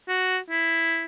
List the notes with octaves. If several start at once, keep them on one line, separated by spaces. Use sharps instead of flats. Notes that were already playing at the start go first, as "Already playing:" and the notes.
F#4
E4